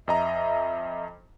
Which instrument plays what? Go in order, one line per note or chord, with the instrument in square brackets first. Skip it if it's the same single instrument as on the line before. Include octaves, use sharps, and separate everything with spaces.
[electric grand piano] F2 D#5 A#5 [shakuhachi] E5